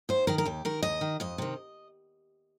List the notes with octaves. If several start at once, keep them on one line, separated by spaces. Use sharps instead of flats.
D#2 C5
D#3 A#4
A#4
D#2 G4
D#3 A#4
D#2 D#5
D#3
F2 D#5
C3 D#3